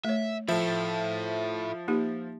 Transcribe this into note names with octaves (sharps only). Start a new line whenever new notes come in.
A3 C#5 E5
F3 E4 A4 E5
A#3 D#4 G4